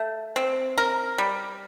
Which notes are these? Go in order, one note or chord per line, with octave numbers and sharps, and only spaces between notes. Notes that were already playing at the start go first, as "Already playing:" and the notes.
Already playing: A3
C4
A#4
G3